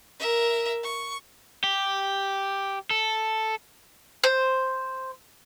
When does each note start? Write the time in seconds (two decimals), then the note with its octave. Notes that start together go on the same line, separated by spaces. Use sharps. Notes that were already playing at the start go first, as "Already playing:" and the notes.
0.19 A#4 E5
0.83 C#6
1.64 G4
2.91 A4
4.24 C5